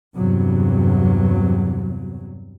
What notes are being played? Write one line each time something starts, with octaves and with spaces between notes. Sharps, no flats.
E2 G2 C3 F#3